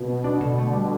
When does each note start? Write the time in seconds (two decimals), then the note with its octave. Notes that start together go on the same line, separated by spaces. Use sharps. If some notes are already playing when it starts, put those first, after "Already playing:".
Already playing: B2
0.08 B3
0.24 D4
0.40 B2 D3
0.58 A3
0.73 G3